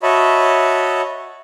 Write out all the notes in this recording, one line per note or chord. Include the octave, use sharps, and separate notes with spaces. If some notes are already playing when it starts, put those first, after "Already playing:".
F#4 C#5 D#5 E5 A5 B5